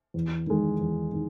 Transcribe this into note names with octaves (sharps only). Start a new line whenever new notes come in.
E2
D#3 G#3
E2
D#3